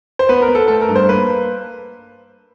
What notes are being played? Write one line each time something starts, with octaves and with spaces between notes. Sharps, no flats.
C5
B3 B4
A#4
B3
A4
A3 A4
A#4
G2
C5
A#3 B4